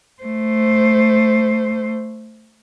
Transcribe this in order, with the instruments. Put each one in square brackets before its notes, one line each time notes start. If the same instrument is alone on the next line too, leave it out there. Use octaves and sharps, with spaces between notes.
[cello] A3 C5